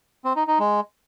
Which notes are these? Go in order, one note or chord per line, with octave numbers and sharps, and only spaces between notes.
C4
D#4
D#4
G#3